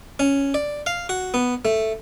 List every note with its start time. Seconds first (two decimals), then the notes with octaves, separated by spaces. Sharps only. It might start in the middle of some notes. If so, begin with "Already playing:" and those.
0.19 C#4
0.54 D5
0.86 F5
1.09 F#4
1.34 B3
1.65 A3